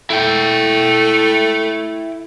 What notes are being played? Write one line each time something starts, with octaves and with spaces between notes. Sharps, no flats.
A3 E4 G5